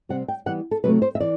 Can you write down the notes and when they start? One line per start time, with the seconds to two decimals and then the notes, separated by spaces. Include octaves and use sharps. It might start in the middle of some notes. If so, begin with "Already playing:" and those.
0.09 C3 G3 C4 F#5
0.28 G5
0.46 E3 G3 B3 F#5
0.71 A4
0.84 C3 F#3 A3 B4
1.02 C5
1.15 E5
1.20 E3 D5